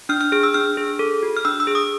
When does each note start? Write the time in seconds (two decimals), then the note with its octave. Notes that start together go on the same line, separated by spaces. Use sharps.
0.09 D4 F6
0.21 F6
0.32 G#4 F6
0.43 E6
0.54 D4 F6
0.77 G#4
0.99 A4
1.23 F#4
1.37 F6
1.45 D4 E6
1.60 E6
1.67 G#4
1.75 D#6